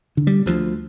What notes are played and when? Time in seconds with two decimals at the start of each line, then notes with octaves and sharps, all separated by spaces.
0.17 D3
0.27 G3
0.46 D2 F3